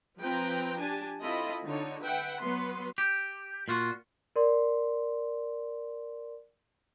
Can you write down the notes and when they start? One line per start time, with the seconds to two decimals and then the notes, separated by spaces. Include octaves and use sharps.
0.20 F3 C4 B4 G5 A#5
0.79 D4 G4 G#5 A5
1.20 C4 E4 F4 A4 D#5 B5
1.65 D3 D#4 C#5
2.02 B4 E5 F#5 G5
2.40 F#3 B3 B4 C6
2.98 G4
3.68 A#2 F4 F#4
4.36 A#4 D5 C6